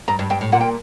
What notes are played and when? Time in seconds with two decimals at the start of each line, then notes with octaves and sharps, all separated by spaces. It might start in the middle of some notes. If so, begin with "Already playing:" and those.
0.08 G2 A#5
0.19 G2
0.30 G2 G5
0.41 A2
0.52 A#2 F#5
0.61 G5